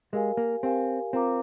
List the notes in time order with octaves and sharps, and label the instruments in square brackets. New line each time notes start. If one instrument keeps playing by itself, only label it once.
[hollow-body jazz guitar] G#3 [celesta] G4 A#4 F5 G#5
[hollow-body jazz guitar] A#3
[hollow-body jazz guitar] C4 [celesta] G4 A#4 F5 G#5
[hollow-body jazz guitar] C4 [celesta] F4 A#4 F5 A#5 D6